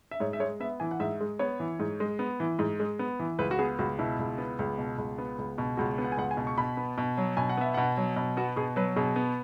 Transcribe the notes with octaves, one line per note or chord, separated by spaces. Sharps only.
E5
G#2 C#5
E5
G#3 C#5
B3 E5
E3 G#5
F#5
G#2 E5
G#3
B3 C#5
E3
G#2
G#3
B3
E3
G#2
G#3
B3
E3
C#2 B4
F#4
B3 G#4
C#2 F#4
B2 E4
C#2
B3
C#2
B2
C#2
B3
C#2
B2
C#2 F#4
B3
F#5
G#5
C#2 F#5
G#5
B2
C#6
B2 B5
B3
B2
F#3
B2 G#5
F#5
B3 E5
B2 F#5
F#3
B2
B3 F#4
B2 G#4
F#3 B4
B2 G#4
B3